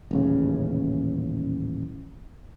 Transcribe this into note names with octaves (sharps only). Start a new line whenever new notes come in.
D#1 A1 C#3